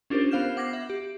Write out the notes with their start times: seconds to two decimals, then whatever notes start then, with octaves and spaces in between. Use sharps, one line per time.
0.10 C#4 D4 F4 G4 A#4 C5
0.31 B3 C5 F5 F6 G6 E7
0.57 F#5 D6 G#6 A#6 C7 F#7
0.73 E5
0.90 G4